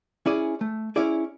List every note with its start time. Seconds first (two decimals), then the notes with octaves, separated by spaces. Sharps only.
0.26 C#4 E4 G#4 D5
0.61 A3
0.96 C#4 E4 G#4 D5